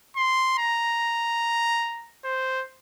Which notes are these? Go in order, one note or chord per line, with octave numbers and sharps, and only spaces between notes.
C6
A#5
C5